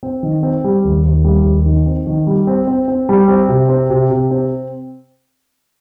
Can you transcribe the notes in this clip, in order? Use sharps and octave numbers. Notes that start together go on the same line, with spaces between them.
C4
D#3
C4
G3
D#2
D#2
G3
D#2
D#3
C4
D#3
G3
C4
C4
C4
G3
C4
C3
C4
C3
C3
C4